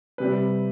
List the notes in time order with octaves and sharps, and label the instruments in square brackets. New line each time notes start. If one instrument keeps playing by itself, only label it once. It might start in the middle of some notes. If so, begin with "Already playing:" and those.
[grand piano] C3 G3 B4